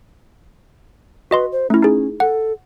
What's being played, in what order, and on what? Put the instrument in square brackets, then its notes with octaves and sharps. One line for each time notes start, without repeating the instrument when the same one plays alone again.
[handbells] F#4 D#5 C6 [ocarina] B4
[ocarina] C5
[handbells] A3 E4 [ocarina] C#4
[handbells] D#4 G#4
[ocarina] A4 [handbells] F#5